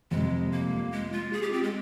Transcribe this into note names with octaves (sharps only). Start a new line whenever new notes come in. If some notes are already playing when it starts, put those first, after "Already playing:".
F2 C3 G3 G#3
A#3
G#3
F4
G#4
G4
C4
G#3